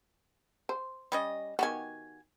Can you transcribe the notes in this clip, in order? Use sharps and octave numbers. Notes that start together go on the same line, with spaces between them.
C5
G3 C#4 D#5
D#3 B3 F#4 G4 G#5